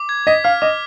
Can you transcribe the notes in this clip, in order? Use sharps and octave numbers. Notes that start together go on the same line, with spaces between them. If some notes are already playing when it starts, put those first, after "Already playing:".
Already playing: D6
G#6
D#5 B6
F5 F6
D#5 D6